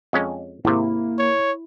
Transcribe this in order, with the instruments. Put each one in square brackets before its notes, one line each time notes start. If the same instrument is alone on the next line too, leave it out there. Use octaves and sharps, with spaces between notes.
[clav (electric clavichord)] F2 G#3 C#4
[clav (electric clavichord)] G#1 C3 [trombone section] A#3 [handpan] E4
[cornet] C#5